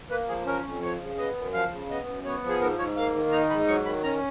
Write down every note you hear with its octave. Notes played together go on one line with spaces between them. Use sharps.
A#3 B4
F3 G#4
C#4 A#4
F2
F3 C#5
C#3
B3 D#5
F#2
F3 F5
C#3
B3 D#5
F#2
B3 C#5
F3
G#4
G#2 A#4
G#2 C#5
A#3 F5
D#3
D#4 A#5
G#2 B5
F#3 C#6
D#3 B5
C#4 A#5